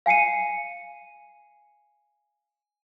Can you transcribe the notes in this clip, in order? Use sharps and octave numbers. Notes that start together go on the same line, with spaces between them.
F5 G#5 C7 C#7 D#7